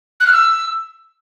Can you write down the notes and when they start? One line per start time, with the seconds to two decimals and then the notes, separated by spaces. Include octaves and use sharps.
0.20 F#6
0.26 F6
0.32 E6